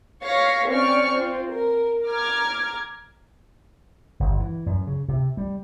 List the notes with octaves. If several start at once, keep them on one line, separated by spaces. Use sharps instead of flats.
C#5 F5 C#6 A#6 B6
C4 C#4 D5 C#6 F6
C4 F4
A#4
A#5 D6 F6 G#6
G1
E3
F#2
C#3
C3
G3